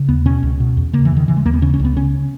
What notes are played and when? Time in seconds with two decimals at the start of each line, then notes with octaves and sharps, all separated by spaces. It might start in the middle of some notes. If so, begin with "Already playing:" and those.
Already playing: C#3
0.09 D#2 B3
0.26 B2 C#4
0.43 C#2
0.60 B2
0.77 E2
0.93 C#3 A#3
1.05 E3
1.11 E2
1.17 D#3
1.28 C#3 E3
1.37 G#3
1.45 D#2 A#3
1.54 B3
1.62 C#3 C#4
1.74 C#4
1.79 C#2
1.85 B3
1.96 C#3 C#4